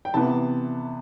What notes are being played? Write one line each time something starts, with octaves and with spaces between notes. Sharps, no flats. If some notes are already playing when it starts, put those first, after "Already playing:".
G5
C3 E3 B3 A5